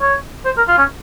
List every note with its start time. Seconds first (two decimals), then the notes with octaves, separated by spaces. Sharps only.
0.01 C#5
0.45 C5
0.57 A#4
0.68 F4
0.78 C#4